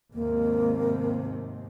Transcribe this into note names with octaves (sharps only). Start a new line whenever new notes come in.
D#2 G#2 C3 A#3